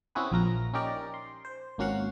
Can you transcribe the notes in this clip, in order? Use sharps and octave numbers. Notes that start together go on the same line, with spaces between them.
C4 C#4 E4 F#4 G#4 B4
A#1 F3 A#4 A#6
C#4 D#4 G4 A#4 D5
C6
C5
G#1 A#3 C#4 F#4 F5 F#5